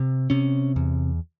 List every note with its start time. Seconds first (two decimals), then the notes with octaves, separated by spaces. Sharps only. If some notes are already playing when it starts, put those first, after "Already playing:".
Already playing: C3
0.30 C3 C#4
0.76 E2